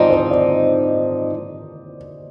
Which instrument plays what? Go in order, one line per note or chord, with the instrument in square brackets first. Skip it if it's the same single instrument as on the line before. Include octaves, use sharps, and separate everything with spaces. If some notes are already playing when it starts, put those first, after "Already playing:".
Already playing: [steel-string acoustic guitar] G#2 F3 C4 D#4 [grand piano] D5 D#5
[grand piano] C5
D5